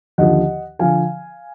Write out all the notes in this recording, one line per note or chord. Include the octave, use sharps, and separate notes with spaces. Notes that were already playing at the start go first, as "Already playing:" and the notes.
D#2 D3 F3 D#5 F#5
D3 F3 F5 G#5